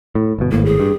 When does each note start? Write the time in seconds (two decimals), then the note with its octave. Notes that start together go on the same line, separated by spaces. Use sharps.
0.15 A2
0.39 G1 B2
0.52 G#1 A2 A#3
0.65 G#4
0.80 G2